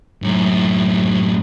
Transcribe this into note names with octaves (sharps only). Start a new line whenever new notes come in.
F#2 A2